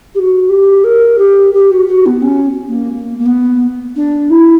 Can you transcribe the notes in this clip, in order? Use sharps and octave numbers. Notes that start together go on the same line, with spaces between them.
G4
F#4
G4
A#4
G4
G4
F#4
F#4
B3
C#4
A#3
A#3
A#3
B3
D4
E4